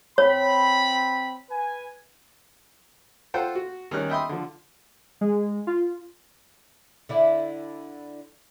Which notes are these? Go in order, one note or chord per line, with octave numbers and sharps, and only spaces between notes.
C4 C#5 B5
B4 G#5
F4 A4 C5 F#5 G5
F#4
D#3 G3 C#4 F6 F#6
D#5 E5 G5 B5 C6 D#6
D3 F3
G#3
F4
D3 E4 D5